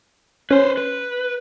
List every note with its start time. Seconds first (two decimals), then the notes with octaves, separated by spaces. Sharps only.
0.51 C#4 B4 C5
0.77 B4